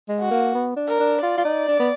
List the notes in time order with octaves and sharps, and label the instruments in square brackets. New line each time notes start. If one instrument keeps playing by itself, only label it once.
[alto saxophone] G#3
[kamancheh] F#4
[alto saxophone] A#3
B3
D4
[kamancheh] A#4
[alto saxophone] D4
[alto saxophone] F4 [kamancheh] D5
[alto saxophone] F4
D#4
D4
B3